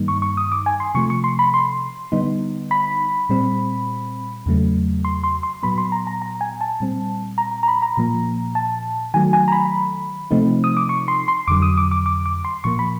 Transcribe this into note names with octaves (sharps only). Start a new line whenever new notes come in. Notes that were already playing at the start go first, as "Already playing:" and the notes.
Already playing: G2 D#3 G3 A#3 D#4
C#6
C#6
D#6
D6
G#5
C6
C3 F3 A3 C#6
C#6
C6
B5
C6
D3 G3 B3 D#4
B5
A#2 G3 C4
E2 C#3 F#3 A3
C6
C6
C6
A#2 F#3 B3 B5
C6
A#5
A#5
A#5
G#5
A5
A#2 G3 C4
A#5
A#5
B5
A#5
A#2 F3 A#3
A5
D#3 F#3 A3 G#5
G#5
A#5
B5
C3 F3 A3 C4 D#4
D#6
D6
C#6
C6
C6
F2 D3 F#3 D6
D#6
D6
D6
D6
D6
C6
A#2 F3 A#3 C#6
B5